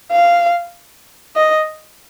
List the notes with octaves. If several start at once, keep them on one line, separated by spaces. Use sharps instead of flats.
F5
D#5